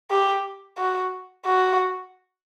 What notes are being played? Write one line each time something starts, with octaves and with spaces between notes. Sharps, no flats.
G4
F#4
F#4